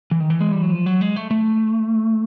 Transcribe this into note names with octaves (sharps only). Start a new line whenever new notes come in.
E3
D#3
E3
G#3
G3
F#3
F3
F#3
G#3
A3
A3